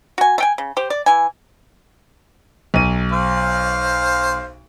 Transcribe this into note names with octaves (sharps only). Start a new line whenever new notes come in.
F#4 G#5
A3 G5 G#5
C#3
G4 C5
D5
E3 G#5
B1 D#7
C5 F5